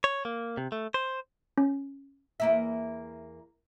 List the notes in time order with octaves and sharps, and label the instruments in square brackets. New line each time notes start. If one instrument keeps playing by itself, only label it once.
[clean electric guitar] C#5
A#3
C3
A3
C5
[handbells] C#4
[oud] E2 A#3 E5